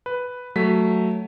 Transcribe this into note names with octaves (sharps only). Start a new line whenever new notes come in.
B4
F#3 A3 B6